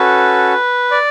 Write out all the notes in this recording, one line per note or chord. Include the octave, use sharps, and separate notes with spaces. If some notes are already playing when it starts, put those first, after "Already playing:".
Already playing: C#4 F#4 A4 B4
D5